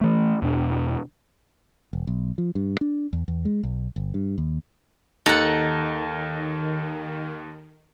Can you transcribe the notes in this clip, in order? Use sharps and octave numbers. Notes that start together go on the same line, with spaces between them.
E3 A3
E2 B2 D4
E1
B1
F3
G2
D4
E2
E2
G#3
B1
G1
G2
D#2
D#2 D#3 D#4 A4 F#5